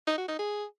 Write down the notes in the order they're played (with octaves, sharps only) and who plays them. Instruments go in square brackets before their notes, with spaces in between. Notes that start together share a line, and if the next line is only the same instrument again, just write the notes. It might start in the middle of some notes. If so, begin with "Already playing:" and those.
[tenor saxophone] D#4
F#4
D#4
G#4